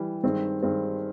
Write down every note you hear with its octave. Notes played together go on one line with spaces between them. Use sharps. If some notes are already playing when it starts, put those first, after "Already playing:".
Already playing: E3 G3
G2 D#3 G#3 C4
G2 D#3 G#3 C4